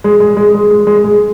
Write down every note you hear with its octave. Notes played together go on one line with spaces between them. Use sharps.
G#3
G#3
G#3
G#3
G#3
G#3
G#3